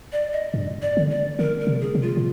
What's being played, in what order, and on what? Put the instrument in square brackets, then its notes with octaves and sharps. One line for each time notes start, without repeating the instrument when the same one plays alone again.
[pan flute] D5
D#5
[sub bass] G2
[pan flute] D5
[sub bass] D3
[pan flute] D5
[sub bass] D3 [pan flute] A#4
[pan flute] A#4
[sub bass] C3
[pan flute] G#4
[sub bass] C3
[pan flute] F4
[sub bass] A#2